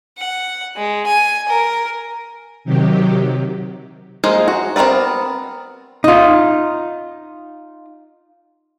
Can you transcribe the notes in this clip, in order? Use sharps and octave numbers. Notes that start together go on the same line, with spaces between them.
F#5
G#3
G#5
A#4
C3 D#3 F#3 G4
F3 G#3 A#3 D#4
F#4
B3 C4 A#4 B4 D5
D#4 F4